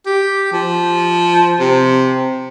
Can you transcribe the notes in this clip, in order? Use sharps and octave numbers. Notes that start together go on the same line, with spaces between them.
G4
F3
C3